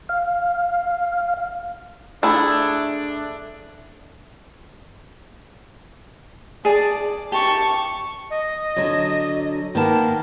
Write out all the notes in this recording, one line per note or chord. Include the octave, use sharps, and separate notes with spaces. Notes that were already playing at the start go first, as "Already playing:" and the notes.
F5
A3 D4 E4 G#4
G#4 D5 A5
G4 A5 C#6
D#5
D3 F#3
D#3 A#3 B3 A5